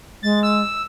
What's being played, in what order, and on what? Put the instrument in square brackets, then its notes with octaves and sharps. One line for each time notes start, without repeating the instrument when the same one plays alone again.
[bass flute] G#3 [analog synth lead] A6
[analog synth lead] E6